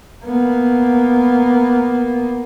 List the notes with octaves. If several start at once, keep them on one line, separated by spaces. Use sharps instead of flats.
A#3 B3